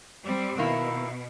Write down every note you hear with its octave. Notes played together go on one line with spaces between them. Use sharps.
G3 C4
B2 D#3 A#3 E4